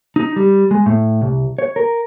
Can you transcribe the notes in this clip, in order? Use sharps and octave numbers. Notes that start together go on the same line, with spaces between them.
D#4
G3
G#3
A2
C2
C#5
A#4